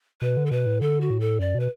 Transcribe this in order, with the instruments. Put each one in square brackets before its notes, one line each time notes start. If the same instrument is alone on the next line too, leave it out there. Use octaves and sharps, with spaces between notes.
[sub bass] B2 [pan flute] B4
[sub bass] D3
[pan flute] A4
[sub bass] B2 [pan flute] B4
[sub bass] A2
[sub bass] D3 [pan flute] A4
[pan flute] F#4
[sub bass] A2
[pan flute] A4
[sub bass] F#2 [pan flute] D5
[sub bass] B2
[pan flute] B4